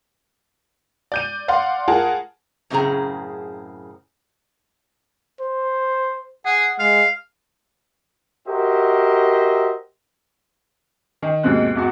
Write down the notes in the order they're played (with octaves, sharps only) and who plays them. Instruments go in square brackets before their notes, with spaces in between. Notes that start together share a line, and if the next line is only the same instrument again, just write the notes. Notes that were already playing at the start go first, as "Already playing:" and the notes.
[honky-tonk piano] D5 G6 D#7
D5 F5 F#5 C6
F4 G#4 A#4 F#5 A5
[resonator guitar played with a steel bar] F#2 A2 C#3 C4 G#4 A#5
[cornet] C5
[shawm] G#4 [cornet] F#5
[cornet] G#3 [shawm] F5
[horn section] F#4 G4 A#4 C5 D#5 E5
[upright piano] D#3
D#2 G#2 B2 C4 F#6
G#1 E2 F#4